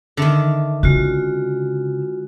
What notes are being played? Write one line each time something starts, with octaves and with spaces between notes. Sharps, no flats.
D3 D#3 E5 A5 D6
C#3 G#3 F4 F#4